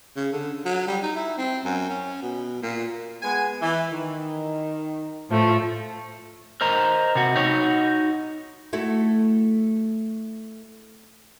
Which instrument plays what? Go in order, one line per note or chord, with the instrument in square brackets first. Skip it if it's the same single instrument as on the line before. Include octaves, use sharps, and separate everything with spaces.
[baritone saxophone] C#3
D3
F#3
G3
D#4
E4
C4
F#2
C#4
B2
A#2
[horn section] G#3 B3 G#5
E3
D#3
[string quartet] A2 F3 A3
[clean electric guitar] A#4 C5 D#5 A#5
C3 F#4
D#4 F#4 C#5
[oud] A3 E4 F#4